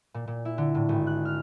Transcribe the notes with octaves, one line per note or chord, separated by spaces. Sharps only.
A#2
A#2
E4
D3
A2
G#1
F#6
F6